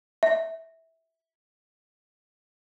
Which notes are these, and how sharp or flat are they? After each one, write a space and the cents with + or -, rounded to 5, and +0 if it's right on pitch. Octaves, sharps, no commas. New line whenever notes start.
E5 -15